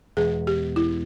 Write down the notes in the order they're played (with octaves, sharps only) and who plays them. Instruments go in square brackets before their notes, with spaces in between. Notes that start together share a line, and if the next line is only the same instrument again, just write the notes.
[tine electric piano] E2 B2 G#3 B3 [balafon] G#4
[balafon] G4
E4